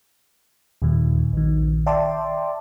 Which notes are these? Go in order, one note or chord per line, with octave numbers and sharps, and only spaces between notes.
D#2 A#2 D#3
A#1 D#3
D5 E5 G5 A5 C6 D6